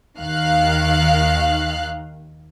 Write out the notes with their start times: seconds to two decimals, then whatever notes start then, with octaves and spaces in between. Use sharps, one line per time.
0.18 D#2 D#3 F5 F#6